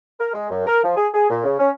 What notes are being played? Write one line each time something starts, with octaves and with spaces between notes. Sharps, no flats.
A#4
G#3
F#2
A#4
F3
G#4
G#4
A#2
C#3
C#4